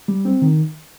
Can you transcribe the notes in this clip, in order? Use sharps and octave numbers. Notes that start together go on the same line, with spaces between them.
G3
C4
D#3